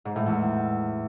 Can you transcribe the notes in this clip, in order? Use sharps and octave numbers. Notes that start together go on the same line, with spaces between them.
G#2
A2
E2